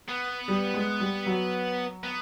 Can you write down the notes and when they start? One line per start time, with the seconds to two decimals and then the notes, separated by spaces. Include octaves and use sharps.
0.09 B3
0.48 G3
0.74 G#3
1.00 G3
1.26 F#3
2.04 B3